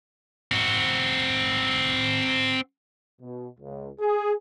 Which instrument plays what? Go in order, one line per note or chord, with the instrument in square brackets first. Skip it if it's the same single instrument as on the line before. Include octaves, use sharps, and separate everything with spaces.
[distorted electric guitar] C4 F#4
[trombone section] B2
C#2
G#4